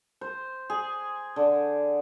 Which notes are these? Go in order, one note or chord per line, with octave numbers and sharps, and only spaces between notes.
C5
G#4
D3